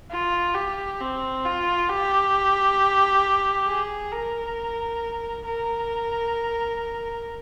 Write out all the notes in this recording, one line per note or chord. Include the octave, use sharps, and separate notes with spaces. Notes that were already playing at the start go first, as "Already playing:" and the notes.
F4
G4
C4
F4
G4
G#4
A#4
A#4